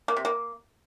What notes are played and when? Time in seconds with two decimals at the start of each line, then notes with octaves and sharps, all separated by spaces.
0.08 A#3
0.17 C3
0.25 A#3